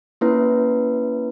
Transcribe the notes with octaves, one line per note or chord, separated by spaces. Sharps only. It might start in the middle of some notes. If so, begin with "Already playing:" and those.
A#3 C#4 E4 B4